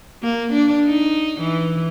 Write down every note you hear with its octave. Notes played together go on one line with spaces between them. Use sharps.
A#3
D4
D#4
E3